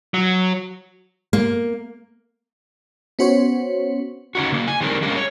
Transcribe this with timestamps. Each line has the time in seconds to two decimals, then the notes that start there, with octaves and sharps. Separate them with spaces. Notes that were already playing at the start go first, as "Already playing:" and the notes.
0.14 F#3
1.33 A#3
3.19 B3 C#4 F#4 C5 C#5
4.35 C#3 C#4 D#4 F#4
4.52 C#3 A#3
4.68 G#5
4.81 D#3 G3 G#3 C4 D4 A#4
5.02 G3 G#3 A#3 C#4
5.16 C#5